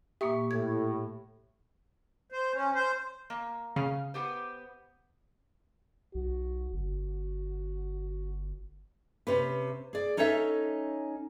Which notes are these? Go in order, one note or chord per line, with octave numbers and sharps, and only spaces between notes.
A#2 A#3 G4 E5 C#6 D#6
A2 G#6
C5
C#4
C5
A#3
C#3 F5
B3 G4 C5
B1 F#4
G1 F#4
C3 C#4 B4
G#4 D5
C#4 D#4 A4 C#5 D#5 E5